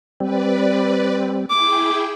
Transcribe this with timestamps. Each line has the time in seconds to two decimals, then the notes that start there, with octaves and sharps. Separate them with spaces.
0.20 G3 C4 B4 D5
1.50 E4 G#4 G5 D6